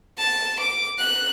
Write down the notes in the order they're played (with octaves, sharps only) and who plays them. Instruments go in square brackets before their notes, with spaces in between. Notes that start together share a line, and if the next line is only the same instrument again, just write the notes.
[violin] A5
D6
F#6